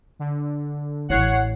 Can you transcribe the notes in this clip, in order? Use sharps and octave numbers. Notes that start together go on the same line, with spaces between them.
D3
A1 E4 C#5 F#5 C7